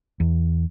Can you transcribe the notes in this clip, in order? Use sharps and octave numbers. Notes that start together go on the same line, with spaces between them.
E2